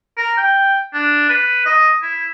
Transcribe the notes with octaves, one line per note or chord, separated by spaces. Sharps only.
A#4
G5
D4
B4
D#5
E4